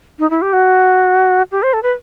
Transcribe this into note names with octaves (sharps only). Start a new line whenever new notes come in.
D#4
E4
G4
F#4
G4
C5
A4
B4